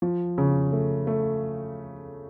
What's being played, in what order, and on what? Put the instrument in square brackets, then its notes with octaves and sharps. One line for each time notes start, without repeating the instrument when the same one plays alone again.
[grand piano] F3
C#3
A3
A3